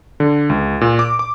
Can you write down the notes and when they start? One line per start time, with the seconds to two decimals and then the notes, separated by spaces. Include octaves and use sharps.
0.20 D3
0.50 C#2
0.81 A#2
0.99 D6
1.19 D6